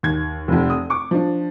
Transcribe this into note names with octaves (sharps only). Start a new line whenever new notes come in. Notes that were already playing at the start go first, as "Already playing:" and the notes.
D#2 G#6
F1 F2
D#6
C#6 D6
F3 D4